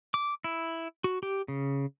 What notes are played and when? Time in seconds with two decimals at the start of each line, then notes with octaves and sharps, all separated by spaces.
0.14 D6
0.44 E4
1.04 F#4
1.23 G4
1.48 C#3